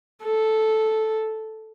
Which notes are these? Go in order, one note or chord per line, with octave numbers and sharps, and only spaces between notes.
A4